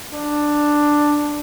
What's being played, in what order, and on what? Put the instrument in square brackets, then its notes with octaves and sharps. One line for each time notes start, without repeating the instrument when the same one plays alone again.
[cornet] D4